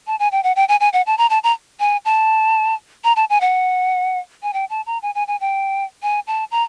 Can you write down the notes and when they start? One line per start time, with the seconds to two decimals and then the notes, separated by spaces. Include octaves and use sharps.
0.07 A5
0.20 G#5
0.32 G5
0.44 F#5
0.56 G5
0.68 G#5
0.80 G#5
0.93 F#5
1.06 A5
1.18 A#5
1.30 A5
1.44 A#5
1.80 G#5
2.05 A5
3.04 A#5
3.16 A5
3.30 G#5
3.41 F#5
4.43 G#5
4.53 G5
4.70 A5
4.86 A#5
5.02 G#5
5.15 G#5
5.28 G#5
5.41 G5
6.03 G#5
6.27 A5
6.51 A#5